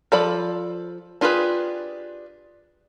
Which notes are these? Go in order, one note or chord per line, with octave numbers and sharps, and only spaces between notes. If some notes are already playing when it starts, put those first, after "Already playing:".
F3 A4 D5 B5
D4 F4 G4 G#4 B4